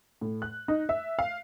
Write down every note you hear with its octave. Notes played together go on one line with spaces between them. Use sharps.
A2
F#6
D#4
E5
F5